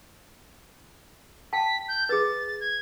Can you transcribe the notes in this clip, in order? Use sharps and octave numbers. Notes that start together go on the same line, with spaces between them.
G5 A5 B6
G6
G#4 B4 A6
G#6